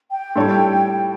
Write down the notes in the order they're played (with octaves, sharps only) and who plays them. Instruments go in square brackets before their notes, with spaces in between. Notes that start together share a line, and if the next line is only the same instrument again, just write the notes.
[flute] G5
[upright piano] A2 G3 D4 A4 C#5